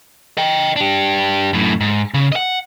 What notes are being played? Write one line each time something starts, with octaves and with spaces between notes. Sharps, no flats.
D#5 G5
D4 G4
F#2 A2
G#2
C#3
D#5 F#5